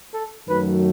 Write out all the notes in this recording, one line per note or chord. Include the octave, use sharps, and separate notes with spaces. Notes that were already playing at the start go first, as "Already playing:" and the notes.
A4
F#2 D#3 F#3 A3 B4